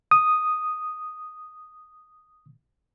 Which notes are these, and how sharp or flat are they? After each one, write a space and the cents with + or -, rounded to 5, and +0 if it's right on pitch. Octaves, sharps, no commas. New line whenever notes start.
D#6 -5